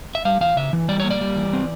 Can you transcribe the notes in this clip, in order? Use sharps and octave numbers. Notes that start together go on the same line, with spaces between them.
E5
G3 F5
E3 F5
C#3 E5
E3
G3 D5
A#3 C#5
D5
G3
E3
C4